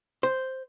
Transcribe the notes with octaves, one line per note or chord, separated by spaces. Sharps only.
C5